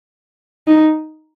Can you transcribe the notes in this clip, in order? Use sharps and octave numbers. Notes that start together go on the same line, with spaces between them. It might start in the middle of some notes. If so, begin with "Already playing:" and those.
D#4